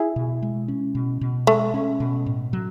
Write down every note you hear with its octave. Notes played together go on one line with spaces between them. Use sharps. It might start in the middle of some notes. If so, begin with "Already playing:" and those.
Already playing: E4 G#4
B2
G#3
C#4
B2
B2
G#3 A3
C#4
B2
A2
F#3